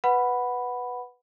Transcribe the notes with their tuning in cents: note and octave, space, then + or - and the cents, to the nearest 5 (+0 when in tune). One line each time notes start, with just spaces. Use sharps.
B4 +0 F#5 +0 B5 +0